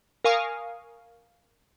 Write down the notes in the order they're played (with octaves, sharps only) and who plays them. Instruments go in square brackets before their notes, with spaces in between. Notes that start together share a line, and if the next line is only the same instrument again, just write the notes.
[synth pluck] A#4 F5 G#5 C#6 D#6